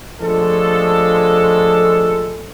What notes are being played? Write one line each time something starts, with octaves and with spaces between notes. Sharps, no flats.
F3 G#3 A3 D4 A4